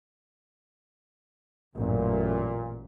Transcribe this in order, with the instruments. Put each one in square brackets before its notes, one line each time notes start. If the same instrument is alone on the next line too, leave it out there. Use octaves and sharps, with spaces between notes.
[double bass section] A1 F#2 [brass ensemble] A#2